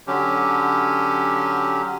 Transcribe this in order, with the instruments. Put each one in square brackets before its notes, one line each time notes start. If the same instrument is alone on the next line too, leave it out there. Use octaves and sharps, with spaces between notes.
[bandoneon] D3 F#3 C#4 G4